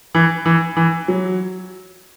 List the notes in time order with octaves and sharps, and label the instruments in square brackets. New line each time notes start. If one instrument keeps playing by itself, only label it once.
[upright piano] E3
E3
E3
F#3